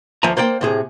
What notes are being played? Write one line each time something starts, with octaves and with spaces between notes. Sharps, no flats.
D2 F3 E5 G#5 A#5
A#3 C5 D5 G5
A2 C3 G#4